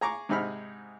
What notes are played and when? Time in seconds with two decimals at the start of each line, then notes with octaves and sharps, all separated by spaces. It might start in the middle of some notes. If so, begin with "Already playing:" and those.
0.01 G#4 A#5 C#6 D6
0.29 G#2 C3 D#4 G#4 B5 F6